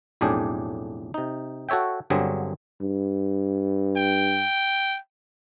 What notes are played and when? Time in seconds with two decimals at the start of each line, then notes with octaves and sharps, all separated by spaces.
0.21 B1 F2 A2 D4 G4 G#4
1.14 C3 D#4
1.69 F#4 A4 C#5 E5 G5
2.10 G1 G2 D3 F#3 C4 G#4
2.81 G2
3.97 G5